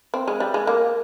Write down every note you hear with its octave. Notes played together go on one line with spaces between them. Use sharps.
C4
G#3
G3
G#3
A#3